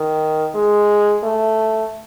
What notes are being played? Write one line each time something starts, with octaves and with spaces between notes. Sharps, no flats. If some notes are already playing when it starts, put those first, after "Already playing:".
Already playing: D#3
G#3
A3